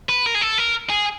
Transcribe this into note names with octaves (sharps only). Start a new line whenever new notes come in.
B4
A#4
G#4
A4
A#4
G#4